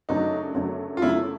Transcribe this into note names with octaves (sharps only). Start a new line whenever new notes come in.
F#2 C#3 F#3 A3 D4 D#4
F#2 C#3 F#3 A3 D4
F4
F#2 C#3 F#3 A3 D4 E4